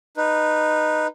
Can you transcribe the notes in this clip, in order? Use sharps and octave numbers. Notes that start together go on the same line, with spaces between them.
D#4 B4